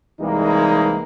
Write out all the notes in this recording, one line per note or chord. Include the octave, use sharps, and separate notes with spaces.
C2 E3 G3 G#3 A#3 D#4